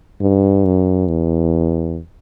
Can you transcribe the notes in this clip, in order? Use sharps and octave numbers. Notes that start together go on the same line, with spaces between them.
G2
F#2
E2